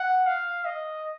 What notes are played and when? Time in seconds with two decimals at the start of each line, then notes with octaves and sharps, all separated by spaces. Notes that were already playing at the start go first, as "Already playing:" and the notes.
Already playing: F#5
0.27 F5
0.65 D#5